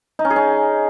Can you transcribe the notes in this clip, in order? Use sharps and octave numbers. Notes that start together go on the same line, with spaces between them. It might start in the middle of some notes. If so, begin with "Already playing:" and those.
D#4
C#4
G#4
C#4